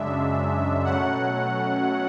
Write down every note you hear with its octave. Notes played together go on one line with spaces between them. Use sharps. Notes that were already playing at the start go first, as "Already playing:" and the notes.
Already playing: F#2 C#3 G#3 D4 E5
B2 F#3 A3 C#4 F#5